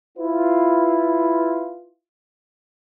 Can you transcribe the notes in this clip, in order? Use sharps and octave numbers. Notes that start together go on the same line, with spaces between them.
E4 F4 B4